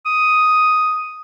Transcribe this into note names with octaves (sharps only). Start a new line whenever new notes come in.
D#6